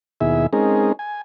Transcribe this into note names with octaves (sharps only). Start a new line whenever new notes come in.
D#2 B2 E4 G#4 E5
G#3 C4 C#4 D#4 G#4 A#4
G#5